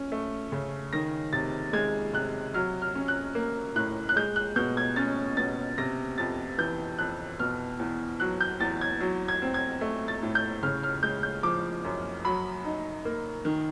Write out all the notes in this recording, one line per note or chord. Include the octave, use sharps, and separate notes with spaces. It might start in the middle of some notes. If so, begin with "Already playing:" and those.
Already playing: C#4
A3
C#3
D#3 A#6
C3 A6
G#3 G#6
C3 F#6
F#3 F6
F6
C#4
F#6
A#3
A2 F#6
F#6
G#3 G6
F#6
B2 G6
G#6
C#4 A6
B2 A6
C3 A#6
F2 A6
E3 G6
F2 F#6
B2 F6
E2
F#3 F#6
G6
E2 A6
G#6
F#3
G#6
C4
G#6
A3
A6
A2
G6
C#3 F6
F6
G#3 G6
G6
F3 D6
F#2
F#3 B5
D#4
A#3
D#3